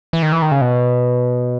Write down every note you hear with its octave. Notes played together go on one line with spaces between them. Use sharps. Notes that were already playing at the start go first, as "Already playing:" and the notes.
E3
D#3
E3
D#3
C#3
B2